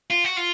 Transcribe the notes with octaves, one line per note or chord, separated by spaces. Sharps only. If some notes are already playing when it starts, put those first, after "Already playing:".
F4
F#4
F4